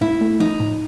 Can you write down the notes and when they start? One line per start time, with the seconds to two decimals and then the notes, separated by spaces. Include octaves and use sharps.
0.01 A2 E4
0.21 A3
0.40 F3 D#4
0.60 A2